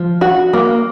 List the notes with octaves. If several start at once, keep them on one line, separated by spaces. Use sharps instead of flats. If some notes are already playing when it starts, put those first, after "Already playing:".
Already playing: F3
F#4
A#3